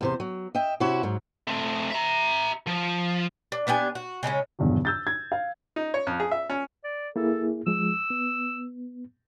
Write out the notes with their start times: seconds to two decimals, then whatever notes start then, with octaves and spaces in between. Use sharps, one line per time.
0.01 E2 C3 C5
0.20 F#3
0.55 D#5 E5 G5
0.80 C3 C#4 E4 F#4
1.03 G#2 F#3
1.47 A3 C4
1.90 E5 A#5
2.67 F3
3.52 D4
3.67 B3 D4 G4 G#5
3.95 F#4
4.23 C#3 G#3 A3 C#4
4.59 G#1 E2 G2 B2 D3 F#3
4.85 E6 G6 A6
5.07 G#6
5.32 F5
5.76 D#4
5.94 C#5
6.07 F2
6.20 G#4
6.31 E5
6.50 C#4
6.84 D5
7.16 A#3 E4 G#4 A4
7.67 F3 G#3 E6
8.10 B3